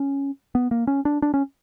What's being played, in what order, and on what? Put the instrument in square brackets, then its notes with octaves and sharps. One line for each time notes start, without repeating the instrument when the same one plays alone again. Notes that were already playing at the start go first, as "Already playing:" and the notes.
Already playing: [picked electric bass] C#4
B3
A#3
C#4
D4
D4
C#4